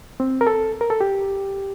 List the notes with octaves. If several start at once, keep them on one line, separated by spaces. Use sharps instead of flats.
C4
A#4
A4
A#4
A4
G4